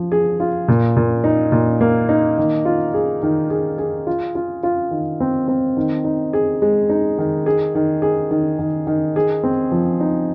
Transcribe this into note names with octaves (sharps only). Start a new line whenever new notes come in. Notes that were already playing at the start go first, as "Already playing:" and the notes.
Already playing: F3
G#4
F4
A#2
A#2
D#4
A#2
A#3
D#4
D#3
F4
G#4
D#3
G#4
G#4
F4
F4
F4
D#3
C4
C4
D#3
D#4
G#4
G#3
D#4
D#3
G#4
D#3
G#4
D#3
D#3
D#3
G#4
C4
F3
D#4